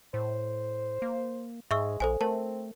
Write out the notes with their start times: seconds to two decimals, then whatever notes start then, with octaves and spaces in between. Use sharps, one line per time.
0.14 A2 C5
1.02 A#3
1.71 G#2 G#3 E5 C#6 E6
2.00 A#1 A4 C5 G#5
2.21 A3 C4 A#4 A5